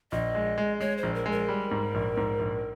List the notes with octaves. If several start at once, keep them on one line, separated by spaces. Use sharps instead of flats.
A#1 D#5
G#3
G#3
G#3 C#5
C5
A#1
A#4
G#3
A#4
G3
G#2
A#1
G#2
A#1